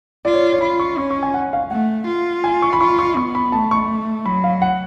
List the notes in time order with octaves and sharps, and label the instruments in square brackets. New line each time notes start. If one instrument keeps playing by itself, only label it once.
[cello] F4 [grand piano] D5
[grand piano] C#5
C#5
[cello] F4 [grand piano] B5
[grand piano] C#6
[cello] C#4 [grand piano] C#6
[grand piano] C#6
G#5
F#5
F5
[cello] A3 [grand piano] F#5
[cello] F4
[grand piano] G#5
C#6
B5
[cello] F4 [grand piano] C#6
[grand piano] C#6
[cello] B3 [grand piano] C#6
[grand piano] B5
[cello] A3 [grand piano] A5
[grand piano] C#6
[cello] F#3 [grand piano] B5
[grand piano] F5
F#5